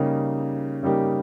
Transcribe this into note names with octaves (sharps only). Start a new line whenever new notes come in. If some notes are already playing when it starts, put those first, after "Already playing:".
Already playing: C#3 G3 A#3 D#4 G4
C#3 G3 A#3 D#4 G4